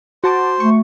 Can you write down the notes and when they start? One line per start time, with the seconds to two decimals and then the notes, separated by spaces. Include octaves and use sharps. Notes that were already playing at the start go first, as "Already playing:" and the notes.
0.24 F#4 C5 A5 D6
0.60 A3 C#6